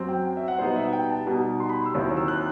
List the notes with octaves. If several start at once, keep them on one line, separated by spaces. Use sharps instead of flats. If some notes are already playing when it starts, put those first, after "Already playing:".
Already playing: F#2 F#3 C4
G5
E5
F#5
B2 G3 B3 D#4 C5
D#5
E5
F#5
G5
A5
B2 G3 D#4
C6
B5
C6
E6
D#2 D#3 F#3 C4 E4
E6
F#6